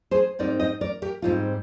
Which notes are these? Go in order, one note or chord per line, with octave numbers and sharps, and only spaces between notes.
G#4 C5
G#2 G3 C4 D#4 A#4 D5
C5 D#5
A#4 D5
G4 A#4
G#2 G3 C4 D#4 F4